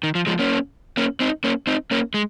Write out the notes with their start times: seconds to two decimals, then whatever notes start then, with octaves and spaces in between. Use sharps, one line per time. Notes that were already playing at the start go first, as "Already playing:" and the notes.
0.03 D#3
0.15 F3
0.27 F3 G#3
0.39 A#3 C#4
0.97 A#3 C#4
1.20 C4 D#4
1.44 A#3 C#4
1.67 C4 D#4
1.91 A#3 C#4
2.14 G#3